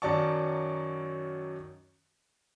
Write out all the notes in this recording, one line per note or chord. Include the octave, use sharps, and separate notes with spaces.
F#2 D#3 F#3 D5 A5 C#6